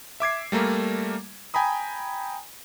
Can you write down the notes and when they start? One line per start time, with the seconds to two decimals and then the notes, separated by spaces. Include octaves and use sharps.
0.20 E5 D6 G#6 C7
0.52 G3 A3 A#3 A#4
1.54 G5 G#5 A#5 B5 D#6